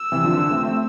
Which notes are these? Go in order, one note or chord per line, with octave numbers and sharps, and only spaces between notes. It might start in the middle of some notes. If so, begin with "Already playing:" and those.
Already playing: E6
C3 E3
D3 F3
D3
A3 C4
A3 C4